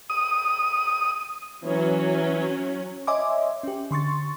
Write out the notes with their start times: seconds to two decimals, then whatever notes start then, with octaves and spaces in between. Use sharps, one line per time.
0.10 D#6
1.64 E3 F#3 C#4
3.07 C#5 D#5 E5 G#5 C6 D6
3.63 C#4 G4
3.91 D3 C6 C#6 A6